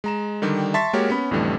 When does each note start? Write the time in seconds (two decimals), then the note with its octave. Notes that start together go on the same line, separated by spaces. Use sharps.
0.04 G#3 A#5 E7
0.42 D3 D#3 G3 G4
0.74 E5 A5 C6 C#6 A6 B6
0.93 G#3 A#3 F#4 G4 A#4 C#5
1.10 B3 C#4 B5
1.31 A1 F2 D3 E3 G3 A3